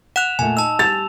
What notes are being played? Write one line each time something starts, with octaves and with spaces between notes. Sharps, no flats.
F#5 F#6 E7 F7
A#2 A3 G#5
D#4 A5 E6
G3 A6 E7 F7